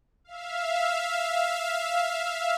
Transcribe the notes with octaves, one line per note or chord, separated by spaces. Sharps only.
E5 F5